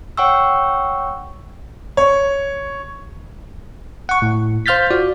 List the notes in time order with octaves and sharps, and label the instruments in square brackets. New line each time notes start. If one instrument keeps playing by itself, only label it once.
[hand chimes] C#5 F#5 G5 C#6 E6
[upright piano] C#5
[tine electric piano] F#5 C#6
A2
C5 F5 F6 G6 A6 B6
F4 F#4 D5